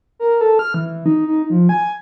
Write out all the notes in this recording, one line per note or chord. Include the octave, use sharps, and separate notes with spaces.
A#4
A4
F6
E3
D#4
D#4
F3
G#5